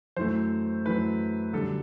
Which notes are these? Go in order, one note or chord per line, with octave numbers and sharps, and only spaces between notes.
F#2 E3 A3 C5
F#2 E3 A3 B4
F#2 D3 G3 A4